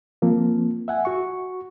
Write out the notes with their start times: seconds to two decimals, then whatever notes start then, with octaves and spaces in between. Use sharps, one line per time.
0.22 F3 A#3 C4
0.88 E5 F#5 G#5
1.05 F#4 C#6